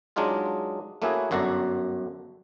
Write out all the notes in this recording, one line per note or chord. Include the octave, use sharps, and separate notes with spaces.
F#3 G#3 D4 D#4 F4 G#4
A3 A#3 C#4 E4 F#4 G#4
G1 F#2 F#4 A4 D5 A#5